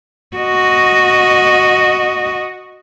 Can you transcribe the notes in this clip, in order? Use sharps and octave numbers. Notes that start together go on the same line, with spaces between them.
F#4 D#5